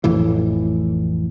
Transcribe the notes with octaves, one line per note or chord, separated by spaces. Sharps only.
A1 F2 A2 E3